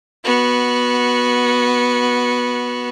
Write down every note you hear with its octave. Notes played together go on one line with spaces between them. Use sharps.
B3 F#4